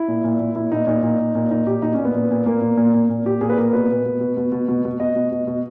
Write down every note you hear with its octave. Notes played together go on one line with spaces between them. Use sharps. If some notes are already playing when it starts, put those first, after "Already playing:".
Already playing: E4
A#2
A#2
A#2
A#2 E4
A#2 D#4
A#2 D#4
A#2
A#2
A#2
A#2 D#4
A#2 G4
A#2 D#4
C#4
A#2
B3
A#2
A#2
A#2 A#3
A#2
A#2
A#2
A#2
A#2 G4
A#2 G#4
B4
A#2 A#4
B2 B4
B2
B2
B2
B2
B2
B2
B2
B2 D#5
B2
B2
B2